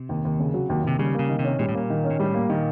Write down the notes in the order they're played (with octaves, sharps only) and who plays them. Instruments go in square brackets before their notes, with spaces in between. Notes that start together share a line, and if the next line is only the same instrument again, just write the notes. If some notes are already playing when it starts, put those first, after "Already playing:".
Already playing: [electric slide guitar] C3
[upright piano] D#2
D#2
C#3
F#3
D#2
[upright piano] D#2 [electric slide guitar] C3
[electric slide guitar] C#3 [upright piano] G3
[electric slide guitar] C#3 [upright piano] A#3
[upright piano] D#3
[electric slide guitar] C3
[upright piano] C#4
[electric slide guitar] A#2 [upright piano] G3
[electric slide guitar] A2
[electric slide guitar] A#2 [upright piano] A#3
[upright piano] D#3
C#4
[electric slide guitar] A#2
[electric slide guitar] A2 [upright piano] G3
[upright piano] A#3
[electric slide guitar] A#2 [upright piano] D#3